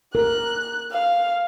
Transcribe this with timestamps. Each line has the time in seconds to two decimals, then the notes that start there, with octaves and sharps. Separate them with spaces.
0.15 A#4 F#6
0.92 F5